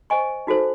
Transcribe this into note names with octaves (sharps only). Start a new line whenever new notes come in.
C5 D#5 G#5 C#6
D#4 F#4 A4 C5